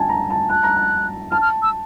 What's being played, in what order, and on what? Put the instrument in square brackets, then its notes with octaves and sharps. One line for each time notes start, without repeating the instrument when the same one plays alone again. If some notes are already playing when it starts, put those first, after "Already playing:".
Already playing: [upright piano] G#5 A5
A#5
A5
[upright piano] A5 [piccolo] F#6
[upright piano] A#5
A5
[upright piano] A5 [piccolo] F6
[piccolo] F6
E6